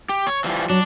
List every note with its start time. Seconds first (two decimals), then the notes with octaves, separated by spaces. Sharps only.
0.09 G4
0.27 C#5
0.44 E3 F3 G3
0.70 F#3 D4